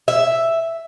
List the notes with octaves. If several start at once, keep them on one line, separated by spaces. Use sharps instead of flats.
E5